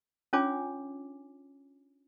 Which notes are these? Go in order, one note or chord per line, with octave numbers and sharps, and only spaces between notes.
C#4 D4 F4 C#5 G#5 D6